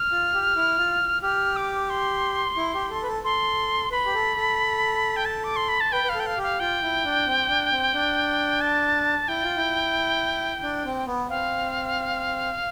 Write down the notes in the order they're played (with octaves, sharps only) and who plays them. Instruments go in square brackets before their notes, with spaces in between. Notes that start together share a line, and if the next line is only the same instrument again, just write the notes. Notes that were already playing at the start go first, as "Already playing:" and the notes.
Already playing: [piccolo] F6
[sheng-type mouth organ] F4
G4
E4
F4
[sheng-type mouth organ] G4 [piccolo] F6
[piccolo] D6
C6
[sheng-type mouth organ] E4
G4
A4
B4
A4
[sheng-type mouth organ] A4 [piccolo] C6
[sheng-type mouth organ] B4 [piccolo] B5
[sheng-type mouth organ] G4
A4
A4
[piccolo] G5
A5
D6
C6
B5
A5
[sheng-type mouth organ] B4 [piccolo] G5
[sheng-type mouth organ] B4 [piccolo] F5
[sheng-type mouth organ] A4
[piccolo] G5
F5
[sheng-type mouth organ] G4
[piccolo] F5
[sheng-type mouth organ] F4 [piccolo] G5
[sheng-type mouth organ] E4
D4
C4
D4
C4
D4
[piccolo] A5
[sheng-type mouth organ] E4 [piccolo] G5
[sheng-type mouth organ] F4
E4
D4
C4
B3
[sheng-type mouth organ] C4 [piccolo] F5